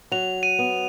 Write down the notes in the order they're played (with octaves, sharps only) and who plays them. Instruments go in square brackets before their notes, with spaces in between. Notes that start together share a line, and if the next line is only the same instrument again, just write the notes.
[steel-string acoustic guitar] F#3 [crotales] F7
[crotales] D#7
[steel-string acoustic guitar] B3